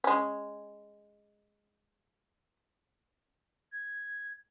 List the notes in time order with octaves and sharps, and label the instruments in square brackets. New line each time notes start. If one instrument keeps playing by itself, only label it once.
[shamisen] G#3 C#4
[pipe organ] G#6